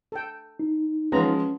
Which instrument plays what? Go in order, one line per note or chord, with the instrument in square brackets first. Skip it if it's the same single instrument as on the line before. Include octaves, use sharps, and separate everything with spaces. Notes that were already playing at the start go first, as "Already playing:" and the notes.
[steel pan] A4 G5
[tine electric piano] D#4
[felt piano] F3 G#3 [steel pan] B3 F4 A#5 [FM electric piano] C#4